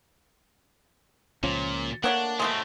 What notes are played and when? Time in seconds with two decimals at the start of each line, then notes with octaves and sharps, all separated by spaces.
1.43 C#2 A#2 F3 C#4
2.04 A3 A#3 D4 C#5 F#5
2.39 A2 G#3 A3 C4 F#4